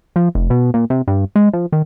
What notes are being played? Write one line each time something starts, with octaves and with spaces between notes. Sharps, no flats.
F3
F1
B2
A#2
C3
G2
G#3
F3
D#3